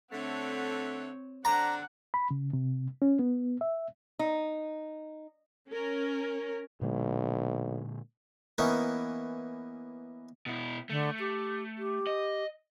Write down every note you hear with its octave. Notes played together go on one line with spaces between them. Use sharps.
D3 A3 C4 C#5 F#5
D3 C4 D4 F#5 A#5
B5
C#3
C3
C#4
B3
E5
D#4
C#4 A#4
B1 A#2 D3 G#3
E3 A#3 B3 C#4 D#4
B2 E4
D3 A3
G4
G4
D#5